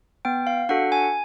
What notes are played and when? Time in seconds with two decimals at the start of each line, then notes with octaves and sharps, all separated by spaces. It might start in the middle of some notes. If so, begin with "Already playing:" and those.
0.25 B3 G5
0.47 F5
0.69 D4 F#4 A4 F#5
0.92 G#5